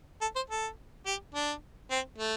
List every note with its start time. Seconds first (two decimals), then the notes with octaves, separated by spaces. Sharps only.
0.21 A4
0.36 C5
0.50 A4
1.06 G4
1.35 D4
1.91 C4
2.18 A3